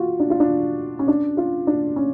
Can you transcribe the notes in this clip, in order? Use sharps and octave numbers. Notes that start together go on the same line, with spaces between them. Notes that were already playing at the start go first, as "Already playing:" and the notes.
Already playing: F4 F#4
D4
F4
D4
C#4
D4
F4
D4
C#4